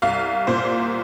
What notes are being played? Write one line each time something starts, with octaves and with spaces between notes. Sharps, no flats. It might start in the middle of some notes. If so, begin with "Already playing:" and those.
C2 F5
A#2 C5